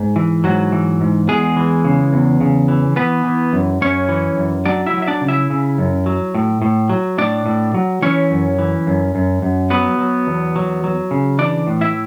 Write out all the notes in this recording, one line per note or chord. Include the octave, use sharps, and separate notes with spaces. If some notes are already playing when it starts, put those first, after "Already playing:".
Already playing: G#2
E3
G#2 F#3 F#4
E3
G#2
E2 G#3 G#4
E3
C#3
E2
C#3
E3
E3 B3 B4
E3
F#2
F#2 C#4 C#5
E3
F#2
F#3 D4 D5
E4 E5
F#3
E5
D4 D5
C#3
E4 E5
C#3
F#2
F#3
A2
A2
F#3
A2 D4 D5
A2
F#3
E3 C#4 C#5
F#2
E3
F#2
F#2
F#2
F#3 B3 B4
F#3
E2
F#3
F#3
C#3
E3 D4 D5
A2
E4 E5